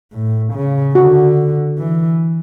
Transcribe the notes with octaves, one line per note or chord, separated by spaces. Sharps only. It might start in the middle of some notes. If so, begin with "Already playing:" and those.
A2
C#3
D3 F#4
E3